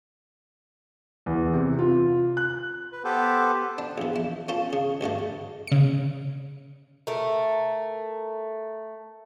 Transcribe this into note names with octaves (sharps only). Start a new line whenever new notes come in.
E2
C3
F4
F#6
B4
B3 G4 A4 B4 C5
D4
A#1 E2
E4
C#4 F4 A4
C#3
D2 G2 D3 A3
C#3 C#7
A3 A#4